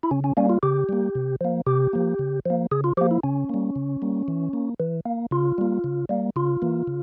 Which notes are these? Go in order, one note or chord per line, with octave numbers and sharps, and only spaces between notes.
E4
C#3 C#4
C#4
G3 A#3 C#4
F4
C#3 G4
G3 A#3
C3
F3 A#3
C3 G4
F3 A#3
C#3
F3 A#3
C#3 G#4
F4
F3 A#3 G4
E4
C#3 C#4
G3 A#3
C#3
G3 A#3
E3
A#3
E3
A#3
C#3 F4
G3 A#3
C#3
G3 A#3
C#3 F4
E3 A#3
C#3